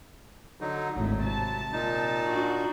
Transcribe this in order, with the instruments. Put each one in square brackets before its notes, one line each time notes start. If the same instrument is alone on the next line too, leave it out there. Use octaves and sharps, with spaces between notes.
[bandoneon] D3 F#3 D#4
[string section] G#1 D2 A2 [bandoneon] F#3
[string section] C3 A5
[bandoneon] A#2 D#4
[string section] D4 F#4